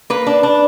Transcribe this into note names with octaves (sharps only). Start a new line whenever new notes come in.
A#3 B4
D4
D4